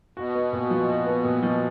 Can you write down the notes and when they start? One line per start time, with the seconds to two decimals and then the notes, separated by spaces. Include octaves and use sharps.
0.17 B2 F#4
0.35 B3
0.53 A#2
0.70 F3
0.89 F#4
1.06 B3
1.24 A#2
1.43 F3